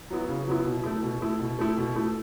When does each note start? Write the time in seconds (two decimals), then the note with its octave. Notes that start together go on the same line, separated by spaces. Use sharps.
0.10 F#3 B3 E4
0.28 C#3
0.48 F#3 B3 E4
0.66 B2
0.84 A3 E4
1.02 B2
1.21 A3 E4
1.39 B2
1.59 A3 E4
1.77 B2
1.95 A3 E4